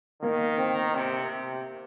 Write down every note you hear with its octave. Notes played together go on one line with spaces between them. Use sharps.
D#3 A#3
C4
C3 C4
C3